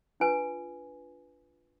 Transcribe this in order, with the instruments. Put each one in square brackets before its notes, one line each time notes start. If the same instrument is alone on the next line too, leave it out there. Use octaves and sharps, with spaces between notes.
[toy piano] D4 F4 B4 G#5